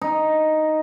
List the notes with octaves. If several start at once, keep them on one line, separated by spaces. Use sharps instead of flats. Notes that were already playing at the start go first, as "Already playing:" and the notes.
D#4